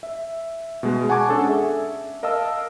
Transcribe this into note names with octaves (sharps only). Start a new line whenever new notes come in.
E5
B2 G#3
F#5 G#5 A5 C#6 D6 G#6
C#4 D4 G#4 A4
E5
A#4 D#5 F5 A5 E6